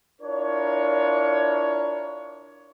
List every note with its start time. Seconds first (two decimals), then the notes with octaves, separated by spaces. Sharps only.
0.21 D4 E4 F4 A#4 C#5